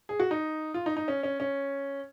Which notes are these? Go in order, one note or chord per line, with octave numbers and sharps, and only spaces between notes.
G#4
F#4
D#4
F4
D#4
D#4
C#4
C#4
C#4